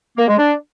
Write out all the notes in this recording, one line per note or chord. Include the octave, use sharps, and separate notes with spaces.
A#3
G#3
D4